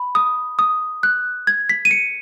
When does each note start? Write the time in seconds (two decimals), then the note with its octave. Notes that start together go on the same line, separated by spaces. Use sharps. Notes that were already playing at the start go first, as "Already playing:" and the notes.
Already playing: B5
0.15 D#6
0.59 D#6
1.03 F#6
1.47 G#6
1.69 B6
1.85 D#7
1.91 C#7